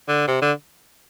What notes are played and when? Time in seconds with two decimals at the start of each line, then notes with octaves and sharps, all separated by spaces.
0.08 D3
0.28 C3
0.42 D3